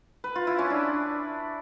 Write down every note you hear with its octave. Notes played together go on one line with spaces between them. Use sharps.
B4
F4
E4
C#4
D4